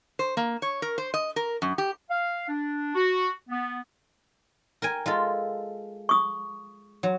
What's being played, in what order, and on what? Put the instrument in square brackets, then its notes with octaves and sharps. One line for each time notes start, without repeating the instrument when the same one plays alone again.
[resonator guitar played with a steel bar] C5
A#3
C#5
A#4
C5
D#5
A#4
F#2
G4
[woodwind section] F5
D4
F#4
B3
[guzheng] A#4 G5 G#5
G#3 F4 A4
[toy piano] C#6 D#6
[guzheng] F#3